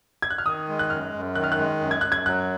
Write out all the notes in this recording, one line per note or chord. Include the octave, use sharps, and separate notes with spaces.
G#6
F#6
F6
D#3 D#6
G#3
F#6
F#2 F6
F#2
D#3 F#6
F6
F#6
G#3
F#2
G#6
F#2 F#6
G#6
F#3 F#6